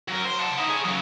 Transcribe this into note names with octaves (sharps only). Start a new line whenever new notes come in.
F#3 A#4
C5
F#5 A5
D#4 E4
G#4 C#5
C#3 F#3